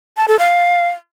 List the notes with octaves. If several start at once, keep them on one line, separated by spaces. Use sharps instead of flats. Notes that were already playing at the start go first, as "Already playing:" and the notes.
A5
A4
F5